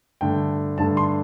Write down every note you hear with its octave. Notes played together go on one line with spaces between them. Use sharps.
G2 D3 A3 G5
G2 D3 A3 A5
C6